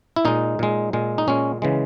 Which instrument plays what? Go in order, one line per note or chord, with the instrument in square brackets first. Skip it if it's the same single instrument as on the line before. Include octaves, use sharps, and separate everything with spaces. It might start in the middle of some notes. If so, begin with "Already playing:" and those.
[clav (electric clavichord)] E4
A#2 G#3 D#4
A#2 G#3
A#2 G#3
D#4
A#2 G#3 C#4
C#3 E3 G#3